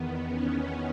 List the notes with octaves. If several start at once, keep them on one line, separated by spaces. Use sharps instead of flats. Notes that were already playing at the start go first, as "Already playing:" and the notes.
Already playing: E2 D#3 B3
C#4